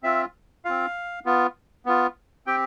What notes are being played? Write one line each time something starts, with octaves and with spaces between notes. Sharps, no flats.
C4 F4 E5
C4 F4 F5
B3 F4
B3 F4
C4 G4 G5